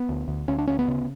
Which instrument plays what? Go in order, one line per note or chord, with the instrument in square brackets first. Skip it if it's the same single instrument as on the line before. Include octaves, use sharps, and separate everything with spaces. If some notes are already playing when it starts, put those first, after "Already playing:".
Already playing: [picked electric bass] B3
D2
D2
D2 C#4
D4
D2 C#4
B3
C#3